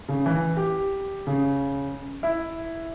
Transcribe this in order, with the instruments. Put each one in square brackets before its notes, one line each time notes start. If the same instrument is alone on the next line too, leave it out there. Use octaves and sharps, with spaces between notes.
[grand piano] C#3
E3
G4
C#3
E4